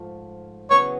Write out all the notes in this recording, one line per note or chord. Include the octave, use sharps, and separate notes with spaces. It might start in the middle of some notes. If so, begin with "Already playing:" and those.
Already playing: G#2 F3 A3
E2 C#3 F#3 B3 C#5